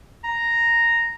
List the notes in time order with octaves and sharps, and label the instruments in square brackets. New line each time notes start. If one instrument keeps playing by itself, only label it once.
[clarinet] A#5